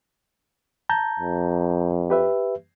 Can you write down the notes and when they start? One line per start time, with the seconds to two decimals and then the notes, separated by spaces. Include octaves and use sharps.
0.89 A5 A#5 G6
1.19 F2
2.10 G4 B4 E5